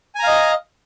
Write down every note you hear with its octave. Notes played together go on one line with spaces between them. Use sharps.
D#5 F5 G#5 A#5